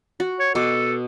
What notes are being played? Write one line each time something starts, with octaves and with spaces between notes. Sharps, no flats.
F#4
C#5
B2 A4 D6